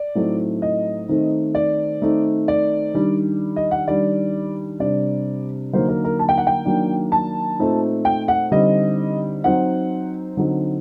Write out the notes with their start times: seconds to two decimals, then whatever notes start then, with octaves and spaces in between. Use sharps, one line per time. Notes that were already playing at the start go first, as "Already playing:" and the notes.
Already playing: D5
0.15 A2 F#3 A3 C4 D#4
0.62 D#5
1.08 D#3 A3 C4 D#4
1.55 D5
2.02 D#3 A3 C4 D#4
2.48 D5
2.94 D#3 G3 D4
3.56 D#5
3.71 F#5
3.87 D#3 G3 D4 D5
4.80 C3 G3 D4 D5
5.73 D3 F#3 A#3 D#4 C5
5.89 A#4
6.04 A#4
6.19 A5
6.29 G5
6.38 F#5
6.47 G5
6.65 D#3 F#3 A#3 D4
7.12 A5
7.59 A#2 A3 C4 D#4
8.05 G5
8.28 F#5
8.51 D3 G3 C4 D#4 D#5
9.44 F#3 C4 D#4 F#5
10.37 D3 F#3 C4 D#4